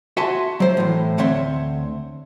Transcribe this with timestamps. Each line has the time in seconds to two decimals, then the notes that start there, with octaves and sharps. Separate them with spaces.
0.17 F#4 E5 F#5 G#5 A5 C6
0.60 F#3 C5
0.77 A2 E3
1.18 D2 C4 C#5 E5 F#5 C6